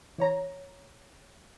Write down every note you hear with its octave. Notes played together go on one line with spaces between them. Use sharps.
E3 C#5 A#5